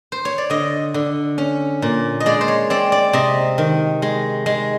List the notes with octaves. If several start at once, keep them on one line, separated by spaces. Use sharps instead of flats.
C5
C#5
D5
D3 D#5
D3
C#4
A#2
D#5
G#3 D5
C5
C#5
C4 D5
D5
C3 D#5
D#3
G#3
G#3